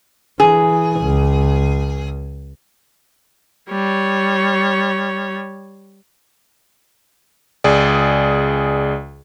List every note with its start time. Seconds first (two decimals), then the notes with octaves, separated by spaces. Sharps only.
0.40 E3 G#4
1.01 C#2
3.70 G3 C#5
7.64 C#2 G#4 D5